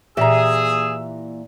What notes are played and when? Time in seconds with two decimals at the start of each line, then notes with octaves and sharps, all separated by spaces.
0.17 A#2 E3 G4 G#4 E5 A#5 E6